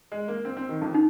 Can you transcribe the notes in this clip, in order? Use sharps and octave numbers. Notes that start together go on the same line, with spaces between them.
G#3
A#3
C4
C4
D#3
F2
D#4